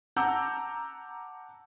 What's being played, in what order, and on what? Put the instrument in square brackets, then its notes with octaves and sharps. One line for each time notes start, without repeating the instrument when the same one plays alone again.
[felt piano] F#5 A5 A#5 D6 E6 G6